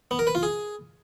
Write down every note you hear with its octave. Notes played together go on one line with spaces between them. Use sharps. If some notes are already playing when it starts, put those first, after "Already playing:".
B3
A#4
B4
F4
G#4